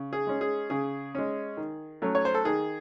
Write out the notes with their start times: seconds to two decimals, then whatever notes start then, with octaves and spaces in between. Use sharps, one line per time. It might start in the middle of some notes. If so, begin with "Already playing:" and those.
Already playing: C#3
0.13 G#4
0.27 G#3 C#4
0.41 G#4
0.70 C#3 G#4
1.15 G#3 C#4
1.57 D#3
2.02 F#3 A3 C#4
2.15 C#5
2.25 C5
2.34 A4
2.45 D#3 G#4